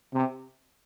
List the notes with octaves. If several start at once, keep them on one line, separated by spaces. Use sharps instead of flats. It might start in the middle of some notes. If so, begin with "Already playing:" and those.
C3